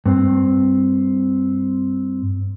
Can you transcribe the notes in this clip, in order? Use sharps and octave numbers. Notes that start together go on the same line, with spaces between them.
G2 C4